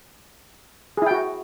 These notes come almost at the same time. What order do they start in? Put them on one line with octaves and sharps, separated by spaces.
G#4 E4 G5 F#4